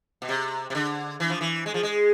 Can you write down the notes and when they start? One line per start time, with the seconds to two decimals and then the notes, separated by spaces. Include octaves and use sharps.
0.22 B2
0.29 C3
0.70 C3
0.75 D3
1.20 E3
1.30 F3
1.41 E3
1.66 G#3
1.74 F3
1.83 G#3